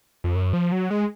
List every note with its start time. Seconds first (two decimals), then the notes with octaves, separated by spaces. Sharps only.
0.24 F2
0.35 F#2
0.53 F3
0.72 F#3
0.90 G#3